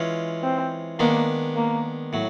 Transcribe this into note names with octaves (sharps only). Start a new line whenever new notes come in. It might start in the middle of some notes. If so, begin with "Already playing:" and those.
Already playing: E3 G#3 C#4 F4
C4
D#3 G#3 A#3 B3 D4
A#3
A2 F#3